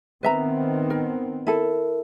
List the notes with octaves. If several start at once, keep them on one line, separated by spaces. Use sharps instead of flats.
D#3 B3 C4 B4 E5 A#5
A#4
E4 A4 A#4